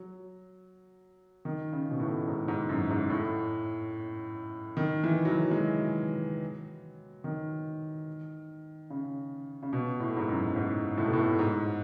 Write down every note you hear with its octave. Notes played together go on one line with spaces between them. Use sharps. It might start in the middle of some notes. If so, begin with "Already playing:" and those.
Already playing: F#3
D#3
C#3
B2
A2
G#2
G#2
F#2
G#2
A2
D#3
E3
F#3
E3
G#3
F#3
D#3
C#3
C#3
B2
A2
G#2
F#2
G#2
A2
B2
A2
G#2